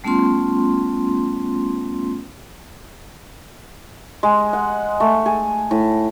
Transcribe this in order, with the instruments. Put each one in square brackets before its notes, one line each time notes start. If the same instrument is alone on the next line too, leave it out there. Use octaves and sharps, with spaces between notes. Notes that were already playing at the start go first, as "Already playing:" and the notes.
[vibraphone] G3 A3 B3 C#4 F4 C6
[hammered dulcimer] G#3
F#5
A3
G#4
A2